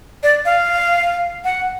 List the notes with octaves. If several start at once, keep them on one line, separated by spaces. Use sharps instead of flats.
D5
F5
F#5